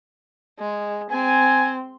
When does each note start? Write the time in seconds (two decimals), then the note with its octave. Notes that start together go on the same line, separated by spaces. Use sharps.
0.59 G#3
1.10 C4 G#5